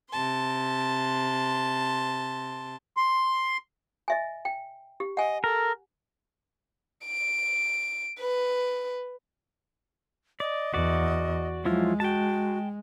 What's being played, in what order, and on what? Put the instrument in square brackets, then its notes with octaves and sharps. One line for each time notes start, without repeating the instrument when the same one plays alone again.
[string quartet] C3 A5 C6
[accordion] C6
[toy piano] D#5 E5 G#5
G5
G4
[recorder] D#5 [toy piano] F#5 G#5
[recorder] A4 [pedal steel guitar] A#4
[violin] D7
B4
[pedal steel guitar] D5 [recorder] D#5
[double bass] E2 [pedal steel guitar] F#4 D5
[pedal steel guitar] F3 E4 F4 [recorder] F#3 [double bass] G#3
[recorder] F#4 [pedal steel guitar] G5 A5